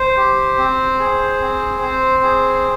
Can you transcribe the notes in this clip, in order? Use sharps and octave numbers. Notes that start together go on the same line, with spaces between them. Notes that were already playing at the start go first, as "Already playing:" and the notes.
Already playing: C5
G4
C4
G#4
C4
C4
G#4